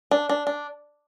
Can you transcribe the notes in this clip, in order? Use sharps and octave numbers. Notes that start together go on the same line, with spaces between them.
D4
D4
D4